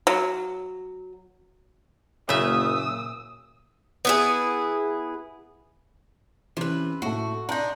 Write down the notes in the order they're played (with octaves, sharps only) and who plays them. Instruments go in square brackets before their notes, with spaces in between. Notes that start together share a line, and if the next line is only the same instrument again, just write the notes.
[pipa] F#3
[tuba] F#1 [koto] A#2 E5 [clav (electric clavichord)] C#3 [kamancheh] D#6 E6
[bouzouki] B3 E4 G#4
[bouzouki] C3 B4 [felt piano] E3 C#4
[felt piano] A2 A3 [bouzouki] F#4
[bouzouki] D4 D#4 [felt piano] A#5 C6 G6